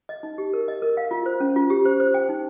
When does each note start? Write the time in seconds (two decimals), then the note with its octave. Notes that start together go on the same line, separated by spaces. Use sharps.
0.09 D#5
0.23 D#4
0.38 G4
0.53 A#4
0.68 D#5
0.82 A#4
0.97 F5
1.11 F4
1.26 C5
1.40 C#4
1.56 F4
1.70 G4
1.85 C5
2.00 C5
2.14 G5
2.29 D#4